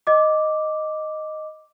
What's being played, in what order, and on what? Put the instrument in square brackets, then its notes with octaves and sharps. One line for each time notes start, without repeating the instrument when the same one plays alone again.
[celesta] D#5 D6